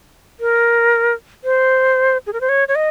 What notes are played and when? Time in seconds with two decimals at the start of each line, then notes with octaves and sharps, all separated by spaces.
0.40 A#4
1.44 C5
2.27 G#4
2.33 A#4
2.41 C5
2.49 C#5
2.68 C#5
2.75 D#5